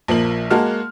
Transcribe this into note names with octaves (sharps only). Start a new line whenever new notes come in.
A#1 F3 A#3 F#7
G#3 A#3 F#4 A5 F6